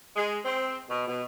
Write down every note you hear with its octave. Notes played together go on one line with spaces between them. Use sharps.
G#3
C4
B2
B2